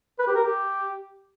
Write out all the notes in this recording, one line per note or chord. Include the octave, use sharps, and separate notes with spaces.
B4
G4
A#4
G4